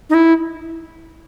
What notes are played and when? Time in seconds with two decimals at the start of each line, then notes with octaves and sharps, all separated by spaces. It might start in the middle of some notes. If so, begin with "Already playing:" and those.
0.10 D#4
0.14 E4